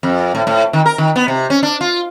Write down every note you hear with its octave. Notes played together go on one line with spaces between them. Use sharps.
F2
A2
A2
D#3
A#4
D#3
B3
C3
C#4
D4
F4